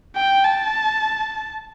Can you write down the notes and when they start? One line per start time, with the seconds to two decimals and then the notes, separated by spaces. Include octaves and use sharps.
0.16 G5
0.44 A5